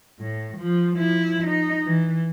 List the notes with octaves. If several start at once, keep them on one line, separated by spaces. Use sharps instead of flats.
A2
F3
F3 E4
D#4
E3